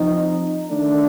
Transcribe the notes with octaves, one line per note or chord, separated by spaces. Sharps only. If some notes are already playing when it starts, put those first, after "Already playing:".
Already playing: F3 C4 D#4
D#3 A3 D4